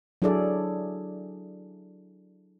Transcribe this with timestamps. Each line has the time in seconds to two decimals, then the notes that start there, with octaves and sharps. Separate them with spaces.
0.22 F#3 D4 E4 G#4 A4 D5